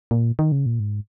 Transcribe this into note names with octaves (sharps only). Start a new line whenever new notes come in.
A#2
D#3
C#3
A#2
G#2